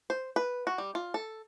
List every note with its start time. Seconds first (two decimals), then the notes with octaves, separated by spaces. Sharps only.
0.10 C5
0.36 B4
0.67 F#4
0.78 G3
0.95 F4
1.14 A4